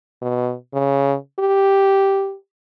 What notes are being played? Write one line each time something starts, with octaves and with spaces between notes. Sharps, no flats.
B2
C#3
G4